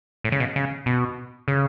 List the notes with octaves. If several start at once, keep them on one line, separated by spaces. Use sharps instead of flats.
A2
C#3
B2
C#3
B2
C#3